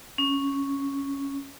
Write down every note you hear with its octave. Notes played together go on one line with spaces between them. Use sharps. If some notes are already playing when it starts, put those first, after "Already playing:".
C#4